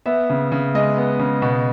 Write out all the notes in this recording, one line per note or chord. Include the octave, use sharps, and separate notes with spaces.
B3 E5
C#3
C#3
G#3 D#5
B3
C#3
B2